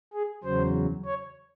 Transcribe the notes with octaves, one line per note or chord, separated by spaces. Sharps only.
G#4
E2 C#3 F#3 C5
C#5